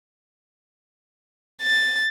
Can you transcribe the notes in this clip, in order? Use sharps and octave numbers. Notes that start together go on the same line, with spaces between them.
A6